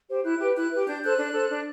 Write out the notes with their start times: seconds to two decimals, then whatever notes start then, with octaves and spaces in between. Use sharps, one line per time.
0.09 G4 C5
0.24 E4 F#6
0.40 G4 B4
0.57 E4 F#6
0.71 G4 B4
0.88 D4 G6
1.03 A4 C5 F#6
1.19 D4
1.34 A4 C5
1.50 D4